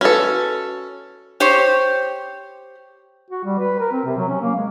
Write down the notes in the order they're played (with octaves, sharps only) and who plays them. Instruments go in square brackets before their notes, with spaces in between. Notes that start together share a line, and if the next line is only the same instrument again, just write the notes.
[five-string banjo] C#4 A4 [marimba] F#4 B4
[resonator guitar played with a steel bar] G4 C5 C#5
[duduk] F#4
G3
B4
A#4
C4
C3
F#3
C#4
A#3
G#3